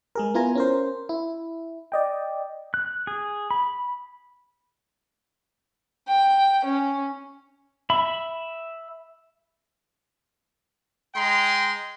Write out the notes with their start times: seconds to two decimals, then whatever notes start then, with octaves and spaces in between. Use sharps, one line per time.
0.15 G#3 G#4 A#4
0.34 B3 E4 F4 A#4 G#5 A#5
0.55 C#4 A#4 C5
1.09 E4
1.92 D5 D#5 G5
2.74 F#6
3.07 G#4
3.51 B5
6.08 G5
6.65 C#4
7.90 E5 B5
11.14 G#3 G5 A#5 C6